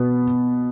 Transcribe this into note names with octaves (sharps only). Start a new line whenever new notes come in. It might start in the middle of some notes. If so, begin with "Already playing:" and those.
Already playing: B2 B3